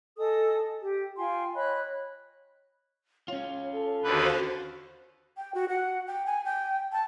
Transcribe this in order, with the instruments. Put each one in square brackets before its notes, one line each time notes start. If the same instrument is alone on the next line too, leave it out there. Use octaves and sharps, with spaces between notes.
[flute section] A4 D#5 G#5 D#6
G4
F4 G5 G#5 C6
C#5 D#5 B5 F#6
[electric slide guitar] C#4 F4 [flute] C#5
[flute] A4
[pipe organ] D#2 D3 B4 [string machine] F#4 C5 F5
[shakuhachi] G5
F#4
F#5
G5
G#5
G5
A5